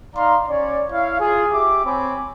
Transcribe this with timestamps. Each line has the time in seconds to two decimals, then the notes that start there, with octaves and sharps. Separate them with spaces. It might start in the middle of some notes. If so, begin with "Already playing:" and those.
0.14 D#4 D5 F5 A#5 C6
0.48 C#4 C#5 D5
0.90 E4 C#5 F5
1.20 F4 G#4
1.51 G4 E5 D6
1.85 C4 C#5 G#5 B5 D6